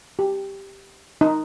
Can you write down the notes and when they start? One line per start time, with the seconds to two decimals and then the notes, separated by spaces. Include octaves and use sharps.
0.19 G4
1.21 D#4